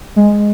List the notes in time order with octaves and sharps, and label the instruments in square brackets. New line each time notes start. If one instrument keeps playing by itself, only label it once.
[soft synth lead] G#3